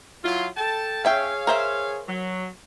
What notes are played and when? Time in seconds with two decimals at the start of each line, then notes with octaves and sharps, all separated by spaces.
0.24 F#3 E4 F4
0.57 A4 G5 A5
1.05 C#4 G#4 C#5 E5 F5 G5
1.47 A#4 C5 E5
2.07 F#3